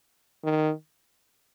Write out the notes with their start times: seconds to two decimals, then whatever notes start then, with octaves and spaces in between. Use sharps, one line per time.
0.44 D#3